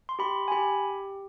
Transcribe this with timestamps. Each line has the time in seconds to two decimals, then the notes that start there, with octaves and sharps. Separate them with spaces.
0.09 C6
0.19 G4 B5
0.48 G#5
0.51 G4 B5